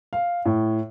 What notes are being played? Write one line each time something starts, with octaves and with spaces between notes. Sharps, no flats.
F5
A2